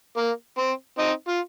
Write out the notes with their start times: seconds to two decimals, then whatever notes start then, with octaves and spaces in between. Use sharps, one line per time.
0.17 A#3
0.58 C4
0.99 C4 D#4
1.28 F4